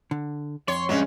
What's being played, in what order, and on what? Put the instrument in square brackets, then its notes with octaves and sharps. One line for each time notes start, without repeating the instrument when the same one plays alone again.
[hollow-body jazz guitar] D3
[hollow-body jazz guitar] F2 [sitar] C#5 [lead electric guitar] C6
[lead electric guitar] G2 [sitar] F#3 [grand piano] G#3 C#4